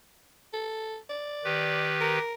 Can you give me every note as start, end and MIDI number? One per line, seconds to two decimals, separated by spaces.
0.53 0.97 69
1.10 1.92 74
1.44 2.19 51
1.44 2.19 67
1.44 2.19 71
2.01 2.34 70